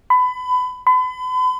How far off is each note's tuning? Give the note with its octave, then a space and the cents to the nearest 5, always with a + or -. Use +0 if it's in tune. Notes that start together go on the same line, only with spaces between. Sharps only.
B5 +25
B5 +40